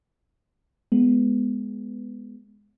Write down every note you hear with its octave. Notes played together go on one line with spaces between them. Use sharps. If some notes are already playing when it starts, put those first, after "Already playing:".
G#3 B3